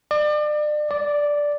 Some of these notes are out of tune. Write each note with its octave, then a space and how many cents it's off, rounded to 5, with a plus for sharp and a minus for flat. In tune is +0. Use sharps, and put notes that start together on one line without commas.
D5 +35
D5 -5